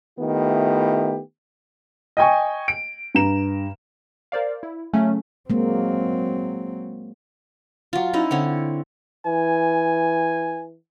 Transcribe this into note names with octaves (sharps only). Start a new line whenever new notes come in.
D#3 A3 B3 E4 F4 G4
D#5 G5 G#5 C#6
D7
G2 A#5 E7
A#4 C5 D5 F5
E4
C#3 F#3 A3 C#4
F#3 G#3 A#3 C4
F#3 F4
C#4 D#4 E4
D3 C4 C#5
E3 G#5